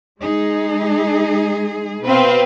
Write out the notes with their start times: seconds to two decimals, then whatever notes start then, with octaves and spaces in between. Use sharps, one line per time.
0.18 G#3 D#4 G#4
2.03 B2 C4 B4 F5